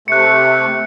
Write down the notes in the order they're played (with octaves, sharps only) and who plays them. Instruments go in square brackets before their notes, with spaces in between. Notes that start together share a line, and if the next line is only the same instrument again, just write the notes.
[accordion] C3 A3 [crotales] F#6 C#7